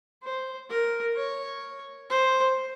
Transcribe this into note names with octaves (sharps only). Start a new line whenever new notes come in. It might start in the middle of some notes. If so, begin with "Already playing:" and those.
C5
A#4
C#5
C5